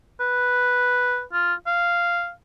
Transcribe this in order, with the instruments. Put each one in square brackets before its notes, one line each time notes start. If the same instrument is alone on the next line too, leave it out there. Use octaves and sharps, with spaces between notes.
[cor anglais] B4
F4
F5